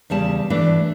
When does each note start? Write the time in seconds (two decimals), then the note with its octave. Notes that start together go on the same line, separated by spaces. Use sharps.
0.10 E2 C#3 G3 A5
0.50 E3 A3 D4